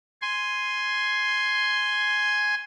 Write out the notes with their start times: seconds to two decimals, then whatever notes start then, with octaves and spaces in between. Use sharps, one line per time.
0.22 G#5 C6